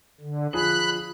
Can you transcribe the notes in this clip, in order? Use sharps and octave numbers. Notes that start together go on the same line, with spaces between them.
D3
F3 G#4 B5 F#6 F#7